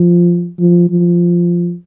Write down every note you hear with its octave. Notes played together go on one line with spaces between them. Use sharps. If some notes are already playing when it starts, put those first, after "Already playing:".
Already playing: F3
F3
F3